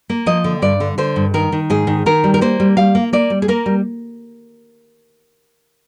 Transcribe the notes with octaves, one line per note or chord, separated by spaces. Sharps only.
A#3
F3 D#5
D3
G2 D5
D3
D3 C5
G2
D#3 A#4
D#3
G#2 G#4
D#3
D#3 A#4
G3
A#4
A#3 C5
G3
G3 F5
A#3
A#3 D5
G3
G#4
A#3 A#4
G3